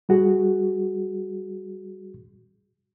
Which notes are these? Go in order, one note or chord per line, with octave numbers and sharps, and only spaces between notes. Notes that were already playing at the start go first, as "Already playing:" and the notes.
G3 F#4 G#4